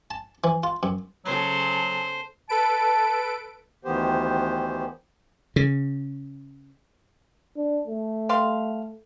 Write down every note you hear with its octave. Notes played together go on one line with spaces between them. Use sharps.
A5
E3
F4
F#2
C#3 F#3 G#4 A4 C5
A4 B4 A5 D7
D2 D#3 E3 B3 G4 C5
C#3
D4
A3
G3 F5 C6